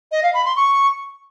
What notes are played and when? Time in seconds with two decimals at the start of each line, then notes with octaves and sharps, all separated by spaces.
0.12 D#5
0.23 F5
0.34 B5
0.45 C6
0.56 C#6